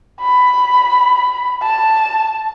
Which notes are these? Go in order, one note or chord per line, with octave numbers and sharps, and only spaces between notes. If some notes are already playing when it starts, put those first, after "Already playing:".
B5
A5